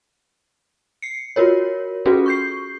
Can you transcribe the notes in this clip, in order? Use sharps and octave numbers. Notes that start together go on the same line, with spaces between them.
C7 C#7
F4 F#4 A#4 C#5
C#4 F4 F#4 G#4 A4 B4
C#6 G6 C7